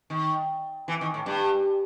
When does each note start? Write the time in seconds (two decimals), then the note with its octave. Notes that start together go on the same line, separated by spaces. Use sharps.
0.10 D#3
0.88 E3
1.01 D#3
1.14 A2
1.26 G2